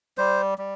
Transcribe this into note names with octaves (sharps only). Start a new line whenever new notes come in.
G3 C5
G3